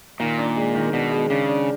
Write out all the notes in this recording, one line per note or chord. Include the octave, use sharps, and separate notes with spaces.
A#2 D#3
D4
G#3
D#3
B2 D4
G#3
C#3 D4
D4